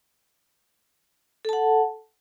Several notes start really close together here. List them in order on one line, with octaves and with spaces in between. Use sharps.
A4 A5 F#5